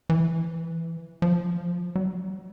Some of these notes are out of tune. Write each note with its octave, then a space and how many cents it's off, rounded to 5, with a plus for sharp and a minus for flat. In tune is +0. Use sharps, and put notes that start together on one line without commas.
E3 +10
F3 +15
G3 -40